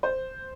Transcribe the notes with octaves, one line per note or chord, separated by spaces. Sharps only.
C5